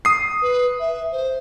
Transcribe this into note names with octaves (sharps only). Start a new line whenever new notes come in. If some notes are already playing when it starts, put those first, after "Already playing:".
D#6 C7
B4
E5
C5